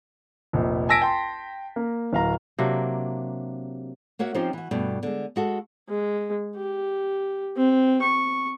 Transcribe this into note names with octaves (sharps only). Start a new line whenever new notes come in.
F1 A#1
G#5 A5 E6 A#6 B6 D7
G5 A5 C6
A#3
D1 F5 A#5
C3 F#3 A#3 D4
A#3 F#4 C#5 E5 F#5
F3 C4 C#4 D#4 F4 G4
E3 F#4
G2 B2 A3
D3 G#3
G#3 F#4 A4
G#3
G4
C4
C#6